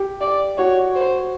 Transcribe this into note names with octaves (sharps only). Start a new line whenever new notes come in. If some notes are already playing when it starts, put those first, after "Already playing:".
Already playing: G4
D5
F#4 C#5
C5